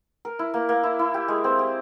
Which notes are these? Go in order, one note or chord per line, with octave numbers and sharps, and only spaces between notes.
A#4
E4
A#3
A#3
E4
E4
G4
G#3
C4
G4